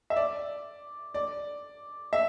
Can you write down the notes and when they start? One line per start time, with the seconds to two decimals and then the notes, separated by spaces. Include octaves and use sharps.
0.10 E5
0.16 D5
1.14 D5
2.13 E5